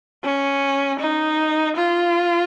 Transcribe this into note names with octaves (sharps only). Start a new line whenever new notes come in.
C#4
D#4
F4